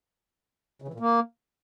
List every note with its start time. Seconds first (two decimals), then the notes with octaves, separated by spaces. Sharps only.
0.82 C#3
0.88 E3
0.94 A#2
1.00 A#3